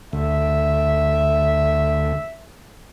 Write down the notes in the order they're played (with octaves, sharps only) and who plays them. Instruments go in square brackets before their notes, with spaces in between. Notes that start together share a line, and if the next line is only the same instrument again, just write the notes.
[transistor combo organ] D2 [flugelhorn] E5